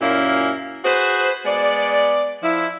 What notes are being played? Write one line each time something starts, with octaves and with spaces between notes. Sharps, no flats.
F#2 A#2 A#3 C#4 E4
F#4 G#4 B4 C5
G#3 B3 D5
F3 E4